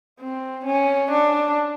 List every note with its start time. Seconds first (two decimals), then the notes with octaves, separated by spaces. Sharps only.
0.20 C4
0.65 C#4
1.11 D4